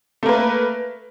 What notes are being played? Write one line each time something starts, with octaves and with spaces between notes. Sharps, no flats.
A3 A#3 B4